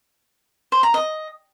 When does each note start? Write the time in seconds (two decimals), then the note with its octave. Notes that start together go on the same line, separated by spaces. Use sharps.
0.72 C5
0.83 A#5
0.94 D#5